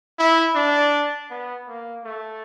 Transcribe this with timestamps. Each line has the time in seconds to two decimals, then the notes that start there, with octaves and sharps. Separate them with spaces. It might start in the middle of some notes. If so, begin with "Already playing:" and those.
0.18 E4
0.55 D4
1.30 B3
1.68 A#3
2.04 A3